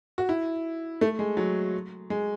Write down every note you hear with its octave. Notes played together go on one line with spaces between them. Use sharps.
F#4
E4
A3
G#3
F#3
G#3